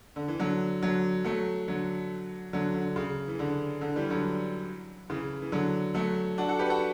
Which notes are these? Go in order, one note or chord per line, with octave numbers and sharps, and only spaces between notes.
D3
E3
D3 F#3
D3 F#3
F#3 A3
D3 F#3
D3 F#3
D3
C#3
E3
D3
D3
E3 G3
D3 F#3
C#3 E3
E3
D3 F#3
F#3 A3
D4 F#4
F#4 A4
G4 B4
F#4 A4